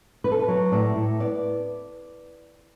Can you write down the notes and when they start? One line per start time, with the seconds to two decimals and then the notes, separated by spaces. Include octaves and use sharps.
0.24 B3 B4
0.32 A4
0.39 B4
0.48 F#3
0.72 A2 D5
0.96 A2
1.20 B3 D5